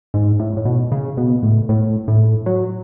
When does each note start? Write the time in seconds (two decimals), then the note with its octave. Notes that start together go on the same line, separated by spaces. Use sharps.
0.14 G#2
0.40 A2
0.57 A2
0.65 B2
0.92 C#3
1.17 B2
1.43 A2
1.69 A2
2.08 A2
2.46 F#3